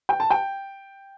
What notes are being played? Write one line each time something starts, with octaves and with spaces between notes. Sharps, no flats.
G5
A5
G5